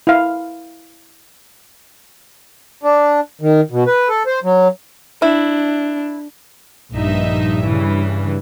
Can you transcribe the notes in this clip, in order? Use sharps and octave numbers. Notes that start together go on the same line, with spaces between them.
E4 F5
D4
D#3
B2
B4
A4
C5
F#3
D4 E4
A#1 G2 D#4 E5
C#3 E3